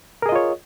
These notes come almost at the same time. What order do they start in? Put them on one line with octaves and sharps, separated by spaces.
A#4 G#4 D#5 F4 C#5